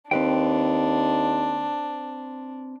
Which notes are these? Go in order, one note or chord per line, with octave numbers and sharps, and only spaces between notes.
D#2 C4 D4 B4 G5